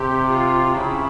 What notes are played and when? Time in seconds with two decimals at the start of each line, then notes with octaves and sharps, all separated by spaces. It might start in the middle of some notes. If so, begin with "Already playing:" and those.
Already playing: C3 G4
0.30 F4
0.76 C#3 E4